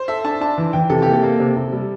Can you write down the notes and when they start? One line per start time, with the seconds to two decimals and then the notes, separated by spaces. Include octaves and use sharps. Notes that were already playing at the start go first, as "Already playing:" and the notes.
Already playing: C5
0.08 A4 E5
0.24 D4 A5
0.41 D4 A5
0.58 E3
0.73 E3 G5
0.90 C3 A4
1.02 A#3 G4
1.13 A4
1.23 A#3
1.40 C3
1.57 C3
1.72 G3